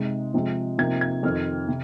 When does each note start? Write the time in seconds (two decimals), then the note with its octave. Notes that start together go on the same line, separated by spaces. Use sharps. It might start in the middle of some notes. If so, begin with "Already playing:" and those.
Already playing: C3 G#3 D#4
0.34 C3 F3 G#3 C4
0.78 C3 F3 A#3 D#4 G#6
1.01 G#6
1.23 F2 D#3 C4 D#4 F6
1.68 C3